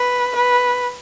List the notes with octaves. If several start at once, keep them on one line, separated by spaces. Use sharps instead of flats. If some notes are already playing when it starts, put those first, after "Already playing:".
Already playing: B4
B4